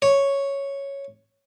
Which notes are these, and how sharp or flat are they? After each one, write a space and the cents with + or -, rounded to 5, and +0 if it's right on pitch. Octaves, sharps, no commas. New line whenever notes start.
C#5 +0